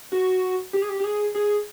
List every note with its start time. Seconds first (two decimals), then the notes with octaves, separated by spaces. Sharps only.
0.12 F#4
0.73 G4
0.82 G#4
0.89 G4
1.00 G4
1.04 G#4
1.35 G#4